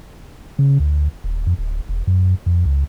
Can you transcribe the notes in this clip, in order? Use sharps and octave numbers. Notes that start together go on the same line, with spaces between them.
C#3
D2
D#1
F2
D1
E1
F#2
F2
C#2